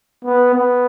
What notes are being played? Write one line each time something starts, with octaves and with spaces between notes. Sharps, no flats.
B3
B3